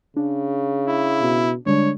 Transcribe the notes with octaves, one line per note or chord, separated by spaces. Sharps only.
C#3 D4
E4
B2
D3 G3 G#3 D4 C#5